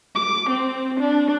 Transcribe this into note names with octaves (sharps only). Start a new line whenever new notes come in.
D6
C4
D4